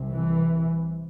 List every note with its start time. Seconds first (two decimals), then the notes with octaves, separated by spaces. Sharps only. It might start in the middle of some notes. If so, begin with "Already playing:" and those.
Already playing: C2 C3
0.11 E3